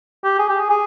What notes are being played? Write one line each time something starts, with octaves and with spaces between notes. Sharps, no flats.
G4
G#4
G4
G#4
G#4